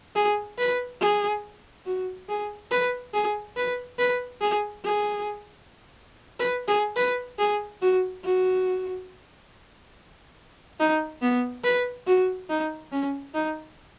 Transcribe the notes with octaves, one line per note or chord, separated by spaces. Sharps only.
G#4
B4
G#4
F#4
G#4
B4
G#4
B4
B4
G#4
G#4
B4
G#4
B4
G#4
F#4
F#4
D#4
B3
B4
F#4
D#4
C#4
D#4